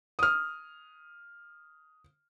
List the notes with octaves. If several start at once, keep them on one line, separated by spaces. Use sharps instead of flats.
D#6 F6